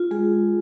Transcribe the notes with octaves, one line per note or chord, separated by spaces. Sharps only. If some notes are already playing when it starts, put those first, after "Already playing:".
Already playing: F4
G#3 G#4